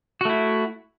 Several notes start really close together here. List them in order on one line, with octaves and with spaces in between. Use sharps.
F#4 A3 E4